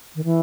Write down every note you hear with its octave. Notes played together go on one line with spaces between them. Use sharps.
D#3
E3